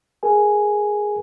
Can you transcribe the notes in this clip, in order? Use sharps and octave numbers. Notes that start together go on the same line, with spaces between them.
G#4 A#4 G#5